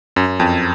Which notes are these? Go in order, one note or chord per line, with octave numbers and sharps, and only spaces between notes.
F#2
F2